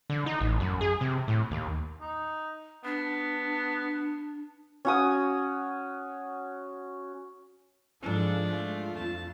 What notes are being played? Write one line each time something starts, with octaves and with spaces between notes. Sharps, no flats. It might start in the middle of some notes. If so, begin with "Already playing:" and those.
D3
D#4
A1
F#2
G#4
C3
A2
D#2
D#4
B3 D4
C#4 F#4 D#6
D2 G#2 F3 G#3 D4 A4
A3 F4
F2 A5